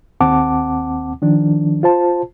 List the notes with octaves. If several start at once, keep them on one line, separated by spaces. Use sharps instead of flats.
D#2 C4 F#5 A5 D6
D#3 F3 D4
F4 C5 A5